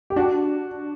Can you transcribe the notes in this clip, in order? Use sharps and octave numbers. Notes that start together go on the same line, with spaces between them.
G4
D4 F#4